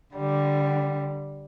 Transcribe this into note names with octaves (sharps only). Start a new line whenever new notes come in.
D3 G3